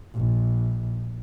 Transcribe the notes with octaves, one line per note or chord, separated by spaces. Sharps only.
A#1